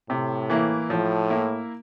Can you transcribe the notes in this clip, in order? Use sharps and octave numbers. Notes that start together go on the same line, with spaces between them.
A2 C3
E3 A#3 E4
A2 F3
A#3 E4